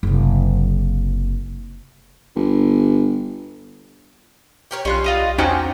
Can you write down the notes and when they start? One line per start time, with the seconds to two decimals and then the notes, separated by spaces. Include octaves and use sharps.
0.03 F#1 C3
2.36 G1
4.71 G4 A#4 C#5
4.85 B1 G3 C#4 F4 F#6
5.04 F4 D#5 F5
5.38 E2 C4 C#4 D#4 F#4 G4 G5